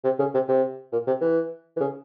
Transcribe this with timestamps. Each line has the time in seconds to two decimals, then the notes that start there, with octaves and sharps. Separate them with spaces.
0.04 C3
0.19 C#3
0.34 C3
0.48 C3
0.92 A#2
1.07 C3
1.21 E3
1.77 E3
1.80 C#3